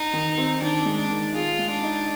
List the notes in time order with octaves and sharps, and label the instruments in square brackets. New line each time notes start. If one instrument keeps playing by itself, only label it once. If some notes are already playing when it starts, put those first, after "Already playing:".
Already playing: [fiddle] D#4
[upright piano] D#3
C4
[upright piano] D#3 [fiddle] D4
[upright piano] G#3
[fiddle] D4
[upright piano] D#3
[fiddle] F4 [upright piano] G#4
[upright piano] G#3
[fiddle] D4
[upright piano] D#4